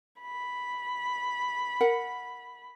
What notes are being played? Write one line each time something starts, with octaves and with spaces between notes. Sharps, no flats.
B5
A#4 F#5